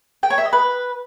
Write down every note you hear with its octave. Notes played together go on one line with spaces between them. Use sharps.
G5
C#5
E5
D#5
B4